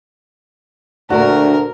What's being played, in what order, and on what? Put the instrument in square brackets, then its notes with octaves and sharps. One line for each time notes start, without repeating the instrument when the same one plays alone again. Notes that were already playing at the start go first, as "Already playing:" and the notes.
[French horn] D2 [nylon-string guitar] A#2 A3 D4 [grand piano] F#4 [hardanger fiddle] A#4